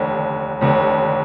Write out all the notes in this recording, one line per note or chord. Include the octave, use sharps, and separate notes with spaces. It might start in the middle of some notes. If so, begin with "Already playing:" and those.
Already playing: F1 D#2 D3
F1 D#2 D3